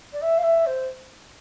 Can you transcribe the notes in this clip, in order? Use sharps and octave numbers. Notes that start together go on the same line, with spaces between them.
D5
E5
F5
E5
C5